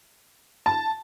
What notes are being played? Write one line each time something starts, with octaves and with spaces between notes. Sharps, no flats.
A5